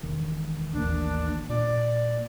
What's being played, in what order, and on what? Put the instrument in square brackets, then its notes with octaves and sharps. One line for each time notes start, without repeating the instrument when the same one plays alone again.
[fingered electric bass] E1 D#3
[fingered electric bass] A1 D#2 A#3 [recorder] D4
[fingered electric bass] A#2 [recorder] D5